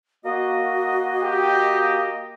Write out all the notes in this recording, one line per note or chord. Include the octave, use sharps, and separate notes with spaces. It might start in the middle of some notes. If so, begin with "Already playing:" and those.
A#3 F#4 D#5
G4 G5